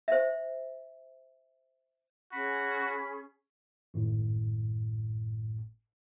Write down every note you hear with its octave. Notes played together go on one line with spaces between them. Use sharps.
C5 E5
C#4 F#4 G#4 B5 C#6
G#1 F#2 A2